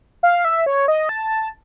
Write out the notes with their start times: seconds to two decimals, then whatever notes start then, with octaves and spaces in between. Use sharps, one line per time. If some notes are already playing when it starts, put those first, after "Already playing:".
0.23 F5
0.45 E5
0.66 C#5
0.88 D#5
1.09 A5